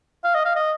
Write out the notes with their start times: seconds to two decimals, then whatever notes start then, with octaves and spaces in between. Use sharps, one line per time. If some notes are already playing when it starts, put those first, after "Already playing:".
0.24 F5
0.35 D#5
0.45 F5
0.56 D#5